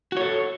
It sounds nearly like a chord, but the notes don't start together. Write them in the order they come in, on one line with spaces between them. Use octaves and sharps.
F#4 C#5 A4